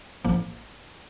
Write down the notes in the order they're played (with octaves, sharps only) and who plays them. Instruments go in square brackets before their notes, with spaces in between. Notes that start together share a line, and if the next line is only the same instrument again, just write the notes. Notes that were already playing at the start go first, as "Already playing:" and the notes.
[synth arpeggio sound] A1 A2 F3 A#3